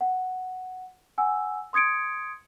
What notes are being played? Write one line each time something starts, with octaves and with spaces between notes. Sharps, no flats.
F#5
F#5 G#5 E6
C6 D#6 G#6 C#7 D7